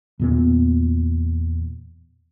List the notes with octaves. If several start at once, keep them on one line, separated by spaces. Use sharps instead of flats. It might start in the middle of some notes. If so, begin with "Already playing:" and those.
E2 A#2 B3